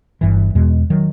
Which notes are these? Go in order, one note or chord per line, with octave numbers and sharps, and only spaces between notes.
G1 G2 E3
E2 B2 G#3
D#3 F#3